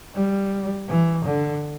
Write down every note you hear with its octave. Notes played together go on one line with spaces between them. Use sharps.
G3
E3
D3